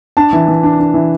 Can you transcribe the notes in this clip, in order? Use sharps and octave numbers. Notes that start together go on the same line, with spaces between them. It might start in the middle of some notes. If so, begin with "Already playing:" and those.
D4 A5
E3
E3
D4
D4
E3